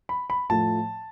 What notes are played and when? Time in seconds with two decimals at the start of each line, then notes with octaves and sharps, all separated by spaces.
0.09 B5
0.30 B5
0.49 A2 F3 A3 A5